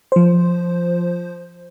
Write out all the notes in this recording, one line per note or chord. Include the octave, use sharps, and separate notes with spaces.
F3 C5